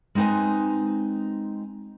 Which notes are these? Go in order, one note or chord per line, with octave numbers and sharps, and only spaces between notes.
G#3 C4 D#4 B4 G#5